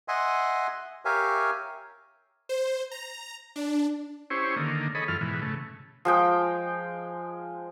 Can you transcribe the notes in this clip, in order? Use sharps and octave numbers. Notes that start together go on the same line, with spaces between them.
D#5 E5 F#5 G#5 C6
G4 A#4 C#5 E5 F5 G#5
C5
A#5
D4
C#4 E4 G4 C5 C#5
D3 D#3 A#3
G#4 A4 C#5 D#5 B5
F#2 E3 F4 A4 F6
G#2 B2 E3
C#3 A3
F3 G#3 G5